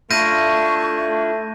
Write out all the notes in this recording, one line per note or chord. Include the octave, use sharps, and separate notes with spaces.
A3 D4 E4 F4 C#6 G6 A#6 D#7